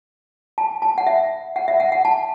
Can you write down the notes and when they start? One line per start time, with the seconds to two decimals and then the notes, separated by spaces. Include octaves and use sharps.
0.58 A5
0.82 A5
0.98 F#5
1.07 E5
1.56 F#5
1.68 E5
1.80 F#5
1.92 F#5
2.05 A5